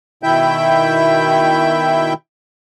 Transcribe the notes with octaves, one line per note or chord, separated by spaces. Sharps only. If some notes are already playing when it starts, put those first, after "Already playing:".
B2 D#3 E4 E5 G5 G6